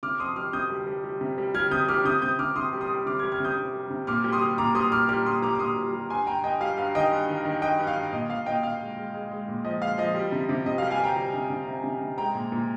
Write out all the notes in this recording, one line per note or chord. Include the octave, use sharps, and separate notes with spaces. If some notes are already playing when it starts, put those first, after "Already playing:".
C3 D6 F6
F2 C6 D#6
G3 D6 F6
C3 D#6 G6
G3
G3
G3
C3
G3
G3 F6 G#6
C3 D#6 G6
G3 D6 F6
C3 D#6 G6
C3 D#6 G6
C3 D6 F6
C3 C6 D#6
G3
C6 D#6
G3
C3 D6 F6
G3 F6 G#6
F6 G#6
C3 D#6 G6
C3
G3
C3
A#2 D6 F6
G3
C6 D#6
G3
A#2 A#5 D6
G3 C6 D#6
A#2 D6 F6
G3 D6 F6
A#2 C6 D#6
G3 A#5 D6
D6
A#2 C6 D#6
G3
G3
G2 G#5 C6
G2 G5 A#5
G2 D#5 G5
G3 F5
G2 F5
D#3 D#5 G5
G2
D#3
D#3
G2 D#5 G5
G2
F5
G2
A#2 D#5
A#2 F5
A#2 D#5 G5
A#2 F5
G#3
G#3
G#3
G#3
A#2
F3 D#5
G#3 F5
F3 D#5
G3
C3
C3
C3 D#5
F5
G3
F5 G#5
G3 G5 A#5
G3
C3
C3
C3
C3
C3
G#3 G5 A#5
A#2
A#2